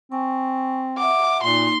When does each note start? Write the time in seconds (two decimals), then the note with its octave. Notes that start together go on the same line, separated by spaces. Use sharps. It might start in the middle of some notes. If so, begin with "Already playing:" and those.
0.12 C4 G#5 C#6
0.98 E5 F#5 D6
1.43 A#2 A#3 D#4 C6